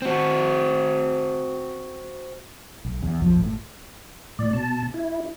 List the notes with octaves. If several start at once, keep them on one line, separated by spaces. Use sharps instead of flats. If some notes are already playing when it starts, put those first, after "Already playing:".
C4 F#4
B1
E2
B1 F2 F3
G#1 A2
A2 D5
B2 A5
E4